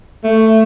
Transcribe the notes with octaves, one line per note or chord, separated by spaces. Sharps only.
A3